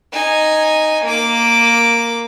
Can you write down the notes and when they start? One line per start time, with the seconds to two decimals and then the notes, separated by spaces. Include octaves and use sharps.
0.13 D#4 G#5
1.04 A#3 D6